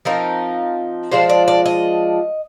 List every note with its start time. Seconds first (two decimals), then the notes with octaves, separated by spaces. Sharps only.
0.05 F3 C4 D#4 A#4
1.11 F3 G#3 D4 F4 C5
1.29 D5
1.48 D5
1.66 D#5